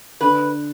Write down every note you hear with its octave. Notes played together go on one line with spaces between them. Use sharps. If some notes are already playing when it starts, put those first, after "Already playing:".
D3 B4